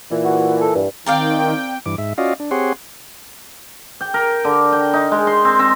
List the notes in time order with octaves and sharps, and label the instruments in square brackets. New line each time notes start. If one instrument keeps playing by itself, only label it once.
[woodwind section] A#2 E3
[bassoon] F#4
A4
G2
[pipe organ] D#3 [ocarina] C4 [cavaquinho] A#4 D5 F5 [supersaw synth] G5
[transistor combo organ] G2 E3 D6
G#2 E5
C#4 F4 F#4 D5 D#5 F5
D4
C4 G4 G#4 C#5 F#5 C6
[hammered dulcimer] G5
A#4
D3
G5
D#4
G#3
C6
C4
C4